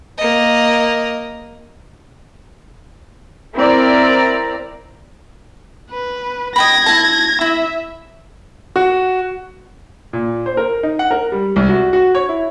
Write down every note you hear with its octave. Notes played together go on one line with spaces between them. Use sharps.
A#3 D#5
C4 E4 A#4 D5 A#5
B4
D#5 G5 B5 G#6 A#6
E4 A5
E4 E5
F#4
A#2
C5
A#4
D#4
F#5
A#4
G3
C2
F#4
F#4
C#5
E4